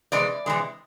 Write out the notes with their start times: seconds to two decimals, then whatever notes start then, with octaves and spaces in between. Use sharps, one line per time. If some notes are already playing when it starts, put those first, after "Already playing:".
0.12 C3 E3 G#3 D5
0.46 C3 E3 G#3